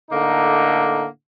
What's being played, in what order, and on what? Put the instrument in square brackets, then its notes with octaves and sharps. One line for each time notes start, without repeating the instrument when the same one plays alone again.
[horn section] A2 D3 A#3 D#4